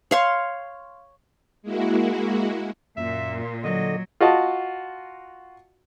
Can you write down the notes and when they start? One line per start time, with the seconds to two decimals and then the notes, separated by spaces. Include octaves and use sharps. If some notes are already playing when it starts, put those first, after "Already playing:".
0.11 C#5 F5 C6
1.62 G#3 A#3 E4 F#4
2.97 F#2 A#2 E5
3.64 D3 F#3 D#5
4.21 F4 F#4 D#5 A5